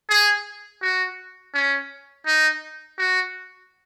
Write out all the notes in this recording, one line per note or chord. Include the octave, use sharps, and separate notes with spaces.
G#4
F#4
C#4
D#4
F#4